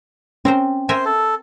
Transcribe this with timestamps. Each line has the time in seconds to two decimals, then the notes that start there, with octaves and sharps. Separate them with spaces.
0.45 C4 C#4 A#4 C5
0.89 A#4 C5 E5 G#5
1.05 A4